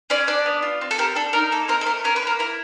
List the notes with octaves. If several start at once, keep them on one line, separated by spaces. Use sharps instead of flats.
C#4 D5
D4 D5
B3
F4
C4
A4
G4 A#4
D4 A4
D#4 A#4
A#3 A4
C4 A#4
A4
A3 A#4
C#4 A#4
B4
A#3 A#4
E4 A#4